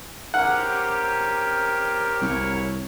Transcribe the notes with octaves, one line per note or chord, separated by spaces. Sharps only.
C4 C#4 G4 A#4 F#5
C2 E4 F#4 C#5